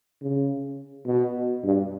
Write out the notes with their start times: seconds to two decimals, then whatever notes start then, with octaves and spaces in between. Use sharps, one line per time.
0.22 C#3
1.07 B2
1.64 G2